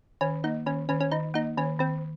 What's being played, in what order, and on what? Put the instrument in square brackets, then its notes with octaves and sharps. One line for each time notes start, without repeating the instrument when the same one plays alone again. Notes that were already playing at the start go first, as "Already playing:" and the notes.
[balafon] D#3 [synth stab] C#4
[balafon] A#3 [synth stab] D#4
[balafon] D#3 [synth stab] C#4
[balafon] D#3 [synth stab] C#4
[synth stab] C#4
[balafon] D#3 [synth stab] D#4
[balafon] A#3 [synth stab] D#4
[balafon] D#3 [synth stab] C#4
[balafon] D#3 [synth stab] C4